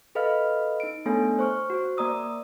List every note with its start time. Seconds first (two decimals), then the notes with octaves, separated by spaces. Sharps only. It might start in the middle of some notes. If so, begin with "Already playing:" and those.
0.15 A4 B4 D#5 F5 B5 F6
0.80 D#4 D7
1.06 A3 B3 D4 A4 C#5 G#5
1.39 C5 C#6 F6
1.70 F#4 C5
1.97 A#3 D5 A#5 D#6 E6